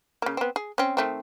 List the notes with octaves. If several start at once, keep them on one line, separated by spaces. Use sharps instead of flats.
C#3 A#3
B3 C4
G#4
C4 C#4
D#3 A3 C4